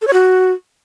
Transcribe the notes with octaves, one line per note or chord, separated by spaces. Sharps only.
A4
C#5
F#4